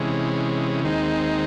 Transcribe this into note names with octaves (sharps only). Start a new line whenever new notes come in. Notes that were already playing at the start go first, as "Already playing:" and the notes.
Already playing: C3 E3 G#3 C#4
D#2 D#3 G#3 C4 D#4